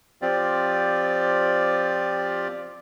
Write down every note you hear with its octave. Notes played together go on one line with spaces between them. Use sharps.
F3 C4 F4 G4 D5